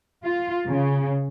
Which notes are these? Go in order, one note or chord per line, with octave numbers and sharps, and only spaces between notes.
F4
C#3